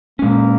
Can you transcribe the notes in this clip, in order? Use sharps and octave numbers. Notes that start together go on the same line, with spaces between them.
A#2 G#3 A#3 C#4